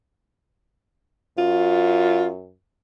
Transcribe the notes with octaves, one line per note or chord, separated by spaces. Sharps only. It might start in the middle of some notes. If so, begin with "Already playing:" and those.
F#2 F4